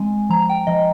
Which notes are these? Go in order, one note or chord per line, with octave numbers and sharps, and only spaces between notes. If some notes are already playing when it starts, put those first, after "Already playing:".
Already playing: G#3 C4 G#5
F3 A#5
G5
F3 D#5